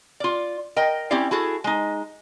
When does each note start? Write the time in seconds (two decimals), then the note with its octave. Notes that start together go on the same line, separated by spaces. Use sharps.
0.20 F4 D5
0.76 A#4 D#5 G5
1.11 C4 C#4 E4 G4 D5
1.31 E4 F#4 G#4 A4
1.64 G#3 D#4